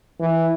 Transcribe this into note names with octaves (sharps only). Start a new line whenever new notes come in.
E3